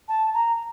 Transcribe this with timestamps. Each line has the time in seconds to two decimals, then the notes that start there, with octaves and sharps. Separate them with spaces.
0.08 A5
0.34 A#5